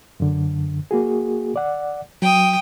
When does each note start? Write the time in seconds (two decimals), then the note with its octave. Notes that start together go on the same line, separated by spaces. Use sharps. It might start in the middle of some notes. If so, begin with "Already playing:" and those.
0.20 F#2 D3
0.91 A#3 F#4 G#4
1.56 D5 F#5
2.22 F#3 G5 D#6